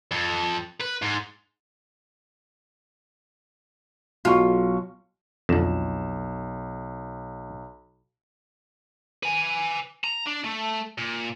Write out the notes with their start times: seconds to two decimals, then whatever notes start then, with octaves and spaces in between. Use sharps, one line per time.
0.11 F2
0.80 B4
1.02 G#2
4.25 B1 F#3 F4 C#6
5.49 B1 F2 D3 E7
9.23 B4 G#5
10.04 A#5
10.26 D4
10.44 A3
10.98 A#2